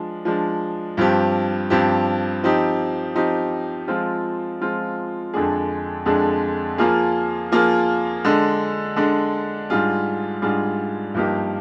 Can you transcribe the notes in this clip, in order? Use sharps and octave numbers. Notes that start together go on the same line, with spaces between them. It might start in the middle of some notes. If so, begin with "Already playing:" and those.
Already playing: F3 G#3 D4
F3 G#3 D4
G2 F3 C4 G4
G2 F3 C4 G4
F3 C4 D#4 G4
F3 C4 D#4 G4
F3 G#3 C4 F4
F3 G#3 C4 F4
F2 D3 G#3 D4 G#4
F2 D3 G#3 D4 G#4
F3 A#3 F4 G#4
F3 A#3 F4 G#4
D3 G#3 D4
D3 G#3 D4
G#2 G3 D4 F4 G#4
G#2 G3 D4 F4 G#4
G2 F3 A#3 D#4 G4